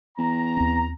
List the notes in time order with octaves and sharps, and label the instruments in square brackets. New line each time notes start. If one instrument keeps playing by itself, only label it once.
[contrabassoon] E2 [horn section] A#5
[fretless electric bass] D#2 C4